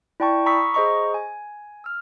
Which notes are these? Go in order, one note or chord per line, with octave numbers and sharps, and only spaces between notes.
E4 D5 G5 A5 C#6
A#5 B5 C#6 D#6 E6 B6
G#4 C5 D#5 A#5 C#6
G#5
E6 F6